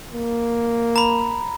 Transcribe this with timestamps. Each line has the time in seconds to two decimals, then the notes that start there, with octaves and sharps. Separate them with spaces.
0.13 A#3
0.96 A#5 B5